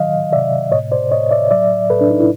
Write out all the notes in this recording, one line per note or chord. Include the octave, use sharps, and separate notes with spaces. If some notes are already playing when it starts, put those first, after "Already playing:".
Already playing: D#3 F#3 D#5 F5
C3 D5 E5
A2 C#5 D#5
C5 D5
A2 C#5 D#5
D5 E5
F#3 D5 E5
A2 A4 B4
D4
D#4
E4